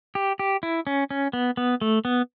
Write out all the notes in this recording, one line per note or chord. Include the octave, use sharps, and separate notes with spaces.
G4
G4
E4
C#4
C#4
B3
B3
A3
B3